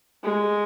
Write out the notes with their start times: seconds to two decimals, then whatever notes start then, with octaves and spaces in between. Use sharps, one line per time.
0.24 G#3